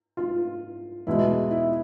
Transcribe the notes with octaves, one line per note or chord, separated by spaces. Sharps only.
F4
E2 B2 G#3 E4
E4